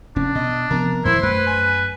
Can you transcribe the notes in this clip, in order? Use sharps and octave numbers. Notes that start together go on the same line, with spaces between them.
F1 C#4 D4
B2 D#5
C3 F3 B3 A#4
F2 A#2 D#3 E4 C5
F#2 A3 B4
G#5